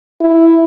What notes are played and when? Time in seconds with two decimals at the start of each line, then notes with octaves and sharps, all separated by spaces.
0.21 E4